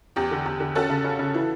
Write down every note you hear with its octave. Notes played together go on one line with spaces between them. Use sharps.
E2 G4
D3
E2
D3
C#4 F#4 A4
C#3
C#4
C#3
E3